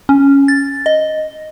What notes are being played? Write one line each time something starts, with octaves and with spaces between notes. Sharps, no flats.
C#4
A6
D#5